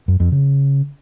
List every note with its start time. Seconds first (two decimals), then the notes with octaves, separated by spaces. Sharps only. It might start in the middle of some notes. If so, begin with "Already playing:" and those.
0.08 F#2
0.20 F2
0.32 C#3